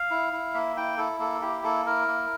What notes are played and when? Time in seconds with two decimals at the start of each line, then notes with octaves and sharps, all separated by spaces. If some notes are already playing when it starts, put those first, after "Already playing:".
Already playing: F5
0.11 E4
0.33 E4
0.54 A#3 E5
0.76 E4 G5
0.98 E4 A4
1.19 A#3 A4
1.42 E4 G4
1.64 A#3 A4
1.86 E4 A#4
2.08 A#3